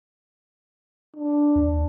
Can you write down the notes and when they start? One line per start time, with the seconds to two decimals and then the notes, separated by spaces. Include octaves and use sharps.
1.16 D4
1.56 D#2